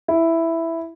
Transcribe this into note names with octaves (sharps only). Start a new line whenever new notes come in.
E4